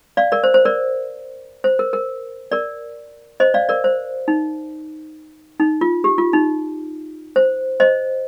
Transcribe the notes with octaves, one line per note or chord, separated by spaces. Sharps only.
D5 F5
A#4 D5
C5
C5
A#4 D5
C5
A#4
A#4
A#4 D5
C5 D#5
D5 F5
A#4 D5
C5
D#4
D#4
F4
G4
F4
D#4
C5
C5 D#5